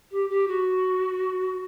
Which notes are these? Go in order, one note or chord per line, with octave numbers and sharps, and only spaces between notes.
G4
G4
F#4